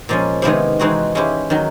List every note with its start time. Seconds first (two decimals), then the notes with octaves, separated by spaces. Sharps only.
0.09 A#2 F3 G#3 C#4
0.42 C3 D#3 G#3 B3 E4
0.79 E3 G#3 C4 D#4 F#4
1.15 G#3 C#4 E4 G4
1.50 D#3 F#3